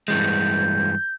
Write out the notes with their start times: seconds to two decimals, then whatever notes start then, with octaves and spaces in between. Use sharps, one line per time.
0.08 G2 E3 G#3 G6